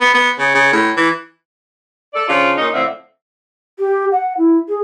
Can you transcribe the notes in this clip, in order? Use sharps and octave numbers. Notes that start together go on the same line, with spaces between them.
B3
B3
C#3
C#3
A2
E3
A4 D5
C#3 F3 D4 F4
A#2 C#4 D#4
A2 D3 F3 C4 E5
G4
F#5
E4
G#4